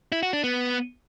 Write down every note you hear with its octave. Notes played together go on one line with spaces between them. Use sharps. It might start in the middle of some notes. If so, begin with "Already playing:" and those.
E4
F#4
D4
B3